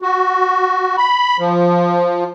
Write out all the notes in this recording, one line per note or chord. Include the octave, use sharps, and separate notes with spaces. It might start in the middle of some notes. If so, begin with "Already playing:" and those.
F#4
B5
F3